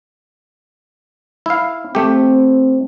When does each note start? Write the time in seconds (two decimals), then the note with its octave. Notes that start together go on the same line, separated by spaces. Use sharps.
1.46 E4 F5
1.95 A3 C4 G4